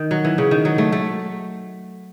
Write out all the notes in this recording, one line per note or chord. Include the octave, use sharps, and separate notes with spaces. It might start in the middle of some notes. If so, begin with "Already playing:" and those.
Already playing: D#3
F#3
E3
C#3
D#3
F#3
A3
A3